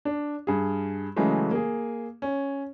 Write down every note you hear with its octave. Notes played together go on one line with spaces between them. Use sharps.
D4
G2 G#4
C#3 E3 F#3 G#3 A3
A#3 G#4
C#4